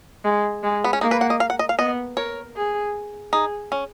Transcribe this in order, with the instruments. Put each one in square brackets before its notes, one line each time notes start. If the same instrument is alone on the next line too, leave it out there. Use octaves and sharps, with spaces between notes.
[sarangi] G#3
G#3
[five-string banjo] B3
C#4
[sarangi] A#3 [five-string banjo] D#4
[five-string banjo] B4
F#5
D#5
F5
F#5
D#5
F5
[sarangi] B3 [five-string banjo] D#5
[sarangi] A#4 [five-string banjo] C#5
[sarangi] G#4
[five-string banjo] D#4 [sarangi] G#4
[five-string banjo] C#4